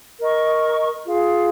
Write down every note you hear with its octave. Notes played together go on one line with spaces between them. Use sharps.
A#4 D#5 C#6
F4 G#4 F5